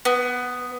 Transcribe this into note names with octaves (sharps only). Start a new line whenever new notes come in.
B3